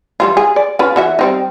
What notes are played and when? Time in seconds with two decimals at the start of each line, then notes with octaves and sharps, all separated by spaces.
0.20 E3 G3 F4
0.37 G#4
0.56 D5
0.79 C#4 F4 B4
0.96 E3 F#4 E5
1.19 G3 C4 D#4